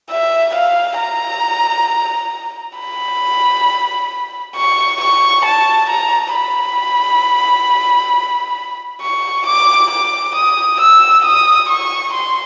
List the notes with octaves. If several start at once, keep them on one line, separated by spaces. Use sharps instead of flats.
E5
F5
A#5
B5
C#6
C#6
A5
A#5
B5
C#6
D6
D6
D#6
E6
D#6
C#6
C6